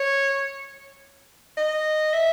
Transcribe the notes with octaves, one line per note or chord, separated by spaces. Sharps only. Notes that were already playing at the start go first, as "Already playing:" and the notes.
Already playing: C#5
D#5
E5